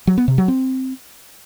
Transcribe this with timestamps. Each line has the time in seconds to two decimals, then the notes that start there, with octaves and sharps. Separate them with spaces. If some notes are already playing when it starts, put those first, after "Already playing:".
0.07 F#3
0.18 B3
0.28 C3
0.38 F#3
0.48 C4